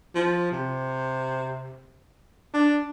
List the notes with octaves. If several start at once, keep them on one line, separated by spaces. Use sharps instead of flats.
F3
C3
D4